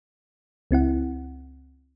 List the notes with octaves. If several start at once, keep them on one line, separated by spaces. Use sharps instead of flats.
C#2 C4 E4 F#5